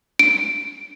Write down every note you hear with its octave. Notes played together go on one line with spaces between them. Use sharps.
D7